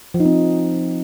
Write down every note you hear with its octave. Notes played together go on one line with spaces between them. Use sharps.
F3
D#4
C4